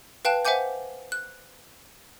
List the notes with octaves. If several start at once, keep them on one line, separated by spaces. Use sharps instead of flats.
B4 F5 G5 A5 F#6
C5 E5 F#5 G#5 D6 G6
F#6